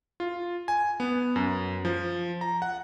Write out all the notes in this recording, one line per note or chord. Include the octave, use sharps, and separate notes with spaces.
F4
G#5
B3
F#2
F3
A#5
F#5